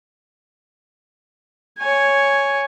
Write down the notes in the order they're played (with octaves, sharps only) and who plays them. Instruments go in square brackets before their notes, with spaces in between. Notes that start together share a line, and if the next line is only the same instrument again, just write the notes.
[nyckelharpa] C#5 G#5